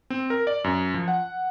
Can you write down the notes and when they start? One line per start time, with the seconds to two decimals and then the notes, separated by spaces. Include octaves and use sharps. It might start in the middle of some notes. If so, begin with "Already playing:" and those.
0.10 C4
0.30 A#4
0.47 D5
0.64 F#2
0.94 F3
1.08 F#5